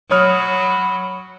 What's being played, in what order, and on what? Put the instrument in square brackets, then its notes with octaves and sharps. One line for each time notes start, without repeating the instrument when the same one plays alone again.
[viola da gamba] F#3 [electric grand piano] C#5 D#6 F6 [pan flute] B5